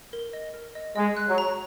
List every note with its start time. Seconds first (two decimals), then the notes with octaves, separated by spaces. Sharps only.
0.13 A#4
0.33 D#5
0.54 A#4
0.75 D#5
0.96 G#3 D#5
1.17 F#6
1.28 F#3
1.38 A#5